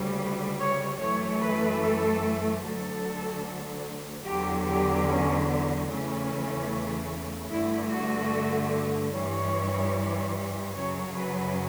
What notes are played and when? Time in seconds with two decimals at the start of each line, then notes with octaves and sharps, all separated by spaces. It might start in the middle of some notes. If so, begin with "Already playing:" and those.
Already playing: D2 C#3 G3
0.18 B4
0.59 C#5
0.99 F#2 E3 A3 C#5
1.41 B4
1.81 A4
2.62 D2 D3 F#3 A4
4.25 E2 D3 F#3 G4
4.65 G4
5.07 C#4
5.47 B3
5.87 E2 C#3 E3 A3 C#4
7.50 G2 D3 A3 E4
7.91 F#4
9.12 G2 E3 G3 C#5
10.75 F#2 C#3 F#3 C#5
11.16 B4